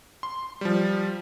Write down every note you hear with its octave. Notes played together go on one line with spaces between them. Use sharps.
C6
F3 G3